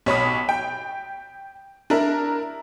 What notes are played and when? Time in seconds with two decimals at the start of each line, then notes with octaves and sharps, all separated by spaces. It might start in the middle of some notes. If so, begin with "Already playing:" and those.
0.06 B1 C#5 B5 D#6
0.49 G5
1.90 D4 E4 A#4